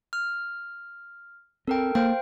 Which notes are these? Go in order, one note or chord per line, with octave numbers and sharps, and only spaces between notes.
F6
C4 A4 A#4 G5
A#3 C5 F5 G5